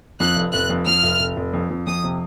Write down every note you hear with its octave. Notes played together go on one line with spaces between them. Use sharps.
F2 F#6
F1
F1 F#6
F2
F2 F6
F1
F1
F1
F2
F2
F2 D#6
C3